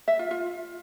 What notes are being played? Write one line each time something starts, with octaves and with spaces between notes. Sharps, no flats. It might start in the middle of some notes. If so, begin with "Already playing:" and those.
E5
F4
F4